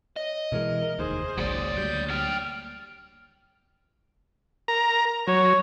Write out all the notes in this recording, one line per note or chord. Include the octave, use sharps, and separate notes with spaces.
C#5 D#5
B2 E3 G#3 A#4 E5
F1 D#2 D#4 G#4 C5
G#1 C#2 F#3 A#3 C#5 D5 D#6
D2 G3 G6
F#3 G5 F6
A#4 A#5
F#3 C#5